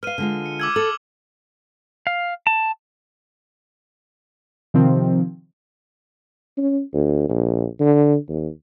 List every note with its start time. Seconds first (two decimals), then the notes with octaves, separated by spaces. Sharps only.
0.03 B4 F5 F6 D#7
0.18 D3 G#3 F4
0.46 C#7
0.60 D6 E6 G#6
0.76 A4 F#7
2.07 F5
2.47 A5
4.74 C3 D#3 F3 C4
6.57 C#4
6.93 D2
7.29 A#1
7.80 D3
8.28 D#2